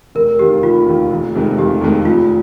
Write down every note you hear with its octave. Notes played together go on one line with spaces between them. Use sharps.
F1 A#4
D#2 D#3 G4
F1 F4
D#2 D#3
F1
F2 C3 D#3 G#3
F1 G4
F2 C3 D#3 G#3
F1 F4